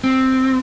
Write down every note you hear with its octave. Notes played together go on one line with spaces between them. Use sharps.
C4